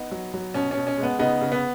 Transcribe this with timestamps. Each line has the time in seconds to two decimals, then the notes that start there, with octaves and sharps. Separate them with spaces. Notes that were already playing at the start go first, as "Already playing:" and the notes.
Already playing: B3 D#4
0.12 F#3
0.34 F#3
0.54 B2 C#4
0.71 C#4
0.77 B2
0.87 C#4
0.98 G#3
1.03 B3
1.19 C#3 B3 D#4
1.41 C#3
1.52 B3